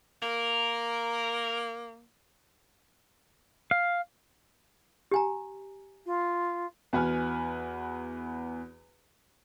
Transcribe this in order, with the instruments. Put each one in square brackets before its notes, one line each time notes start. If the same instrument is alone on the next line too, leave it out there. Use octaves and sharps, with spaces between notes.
[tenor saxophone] A#3 [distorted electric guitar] A#4
[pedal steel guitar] F5
[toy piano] G4 G#5 A#5
[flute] F4
[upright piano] E2 F#4 B4 F#5 G#5 F6